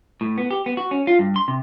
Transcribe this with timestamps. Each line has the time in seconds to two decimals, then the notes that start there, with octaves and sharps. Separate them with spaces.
0.21 A2
0.38 B3
0.51 G4
0.66 B3
0.77 F#4
0.91 C#4
1.07 F4
1.19 G2
1.36 C6
1.48 C3